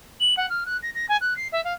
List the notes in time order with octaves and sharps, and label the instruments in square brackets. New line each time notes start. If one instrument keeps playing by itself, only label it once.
[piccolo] F#7
F#5
F6
F#6
A#6
A#6
G#5
F#6
C7
E5
F5